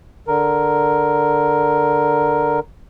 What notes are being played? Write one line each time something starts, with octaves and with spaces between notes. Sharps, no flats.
D3 A#4